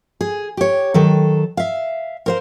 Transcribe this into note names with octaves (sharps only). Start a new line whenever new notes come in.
G#4
G4 C#5
D#3 F#3 A4
E5 F5
A#4 C5 F5